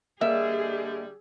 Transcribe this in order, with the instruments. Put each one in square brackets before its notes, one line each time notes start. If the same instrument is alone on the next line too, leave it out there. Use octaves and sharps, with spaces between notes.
[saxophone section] D3 G3 [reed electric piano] A#3 D#5 [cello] G#4 [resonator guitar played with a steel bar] E5